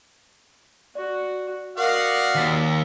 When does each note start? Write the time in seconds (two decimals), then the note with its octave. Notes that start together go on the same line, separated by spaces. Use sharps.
0.95 F#4 D5
1.77 F#4 A#4 D5 D#5 F5 F#5
2.35 D#2 A6 B6 C7